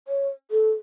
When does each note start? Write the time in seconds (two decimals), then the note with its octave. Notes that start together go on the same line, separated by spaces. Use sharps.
0.08 C#5
0.51 A4